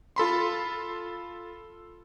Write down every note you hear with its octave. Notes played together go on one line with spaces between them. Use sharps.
F4 A4 B5 C6